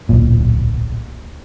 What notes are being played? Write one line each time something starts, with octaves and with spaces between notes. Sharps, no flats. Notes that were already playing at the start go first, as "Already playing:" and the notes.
D1 B1 A#2